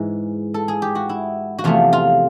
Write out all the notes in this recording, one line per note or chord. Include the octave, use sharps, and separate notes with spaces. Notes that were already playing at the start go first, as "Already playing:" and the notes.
Already playing: G#2 E3 G#3
A4
G#4
G4
F#4
E4
F#4
E2 C3 F3 A3 F4
F4